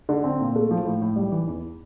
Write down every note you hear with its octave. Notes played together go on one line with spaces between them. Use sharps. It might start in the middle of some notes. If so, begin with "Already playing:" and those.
D3
C4
A#2
A3
F3
A2
A2
G3
E3
E2